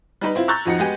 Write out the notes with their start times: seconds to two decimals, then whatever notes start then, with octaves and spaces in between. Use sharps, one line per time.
0.21 G3 D#4 B4
0.35 C4 E4 F4
0.48 A#5 C#6 E6 F#6 G6 A6
0.65 F2 F3 D#4 F#4 A#6 C#7
0.79 G#3 B3 F#4 G4 D#5 G#5